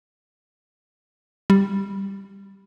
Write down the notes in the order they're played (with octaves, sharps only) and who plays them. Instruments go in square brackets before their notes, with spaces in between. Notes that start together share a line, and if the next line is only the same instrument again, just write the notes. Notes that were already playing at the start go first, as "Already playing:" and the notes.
[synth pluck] G3